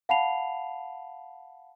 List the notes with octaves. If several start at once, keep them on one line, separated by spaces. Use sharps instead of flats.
F5 F#5 A5 B5 C7 F7